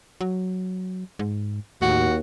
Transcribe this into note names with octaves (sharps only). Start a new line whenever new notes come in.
F#3
G#2
D#2 A2 F#4